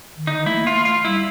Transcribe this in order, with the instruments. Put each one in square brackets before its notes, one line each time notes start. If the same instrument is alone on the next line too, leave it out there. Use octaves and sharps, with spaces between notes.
[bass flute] D#3
[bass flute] D3 [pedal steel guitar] D#4
[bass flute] D#3
[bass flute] A3 [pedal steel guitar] E4
[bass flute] A#3
[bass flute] A3 [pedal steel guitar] F4
[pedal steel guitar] F4
[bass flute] G3 [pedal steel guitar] E4